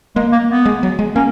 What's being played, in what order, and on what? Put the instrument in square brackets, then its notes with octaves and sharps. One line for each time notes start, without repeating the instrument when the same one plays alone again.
[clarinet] G#3 [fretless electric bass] A#3
[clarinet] A#3
B3
[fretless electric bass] G#3
F#3
G#3
[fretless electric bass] A#3 [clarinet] C#4